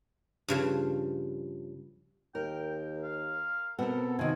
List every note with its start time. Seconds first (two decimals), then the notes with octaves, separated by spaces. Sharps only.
0.48 G2 C#3 F3
2.35 D#2 A#4 G5
3.03 F5
3.79 B2 B3 C4 A4 A#4 F#5
4.19 F2 C3 D#3 F#4 G#5